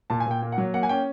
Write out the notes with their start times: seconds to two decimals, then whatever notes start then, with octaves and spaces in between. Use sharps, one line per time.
0.10 A#2 A5
0.20 G#5
0.26 A#2 G5
0.42 A#3
0.52 F#5
0.58 F#3
0.74 A#3 F#5
0.83 G#5
0.89 C#4 G5